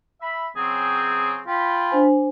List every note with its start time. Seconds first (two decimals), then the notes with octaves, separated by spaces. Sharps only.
0.21 E5 B5
0.56 C#3 F#3 C4 G#4
1.47 F4 G5 B5
1.90 D4 C5 G#5